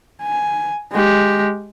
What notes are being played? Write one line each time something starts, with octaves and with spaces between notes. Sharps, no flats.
G#5
G#3 G4